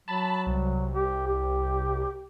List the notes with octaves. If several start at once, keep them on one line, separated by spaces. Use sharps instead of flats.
F#3 A5 B5
C2
G4
G4